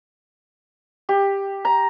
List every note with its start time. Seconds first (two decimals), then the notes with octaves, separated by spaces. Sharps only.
1.09 G4
1.65 A#5